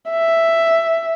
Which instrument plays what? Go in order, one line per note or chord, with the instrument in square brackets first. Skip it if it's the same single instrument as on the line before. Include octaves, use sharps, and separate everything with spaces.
[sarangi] E5